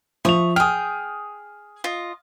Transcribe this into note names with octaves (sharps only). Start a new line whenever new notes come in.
F3 E5 C#6 D#6 F7
G#4 G5 D#6 F6
F4 D#5